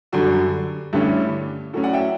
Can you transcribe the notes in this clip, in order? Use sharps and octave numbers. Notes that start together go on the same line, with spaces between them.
F#2 D3 G3 F#4 A4
G2 D3 A3 C#4 E4 G4
A2 F#3 C#4 F#4 A4
D5 F#5
E5 G5